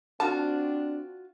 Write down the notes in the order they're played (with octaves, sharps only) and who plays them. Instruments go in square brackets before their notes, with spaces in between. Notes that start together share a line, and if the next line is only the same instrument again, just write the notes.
[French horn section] C4 D4 [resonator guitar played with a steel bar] F4 F#4 [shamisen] A5